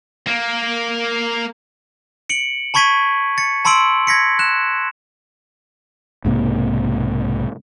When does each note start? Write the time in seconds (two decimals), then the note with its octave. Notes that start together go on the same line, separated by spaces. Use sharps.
0.27 A#3
2.30 C#7 D7 F#7
2.74 A5 B5 C#6 G#6 B6 D#7
3.38 A6 C#7
3.65 A5 B5 C6 E6 D7 F#7
4.07 G#6 A#6 B6 C#7
4.39 F#6 E7
6.25 B1 G#2 C3 A#3